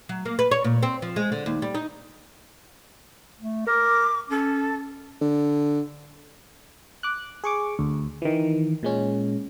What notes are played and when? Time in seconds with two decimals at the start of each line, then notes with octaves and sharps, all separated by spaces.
0.09 F#3
0.25 A#3
0.39 B4
0.51 C#5
0.64 A#2
0.83 C4
1.02 F3
1.16 G#3
1.32 D3
1.46 D#2
1.62 G3
1.74 D#4
3.39 A3
3.67 A#4 D6
4.30 C#4 A4
5.21 D3
7.03 D6 F#6
7.44 G#4 C#6 D6
7.79 D2
8.22 D#3 E3
8.83 A#2 G#3 C#4